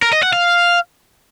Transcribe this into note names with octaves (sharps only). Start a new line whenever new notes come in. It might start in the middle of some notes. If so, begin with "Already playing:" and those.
A#4
D#5
F#5
F5